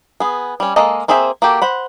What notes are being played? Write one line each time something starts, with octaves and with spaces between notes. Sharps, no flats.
B3 G#4
G3 C#4
G#3 A#3 A4 D#5
A#3 C4 G#4 C5 E5
A#3 F#4 G4 A4
C5 F#5 B5